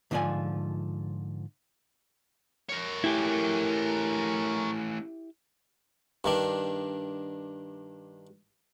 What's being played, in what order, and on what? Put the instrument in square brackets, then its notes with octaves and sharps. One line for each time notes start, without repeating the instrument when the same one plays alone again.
[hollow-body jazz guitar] G#2 D3 F3 F4 D5 G#5
[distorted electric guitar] A#4 C#5
[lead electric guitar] A3 C#4 [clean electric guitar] E4 G4
[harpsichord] G2 D#3 D4